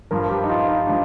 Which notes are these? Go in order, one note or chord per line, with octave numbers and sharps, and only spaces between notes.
G2 F3 A#4
G4
D#4
F4
D#4
F3 D4